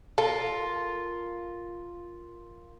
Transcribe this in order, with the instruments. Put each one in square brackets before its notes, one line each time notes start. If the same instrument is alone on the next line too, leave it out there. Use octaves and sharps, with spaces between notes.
[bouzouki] F4 A#4 [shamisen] A4